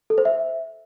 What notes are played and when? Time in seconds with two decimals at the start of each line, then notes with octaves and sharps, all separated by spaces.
0.10 A4
0.18 C5
0.25 E5